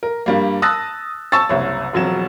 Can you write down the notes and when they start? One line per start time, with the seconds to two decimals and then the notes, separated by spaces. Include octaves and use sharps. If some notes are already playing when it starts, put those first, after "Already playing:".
0.03 A#4
0.26 G2 G3 A#3
0.62 A5 D#6 E6 F#6 A6 A#6
1.32 A5 C#6 E6 A6
1.49 F#1 C2 C#5
1.93 E1 F2 F#3 E7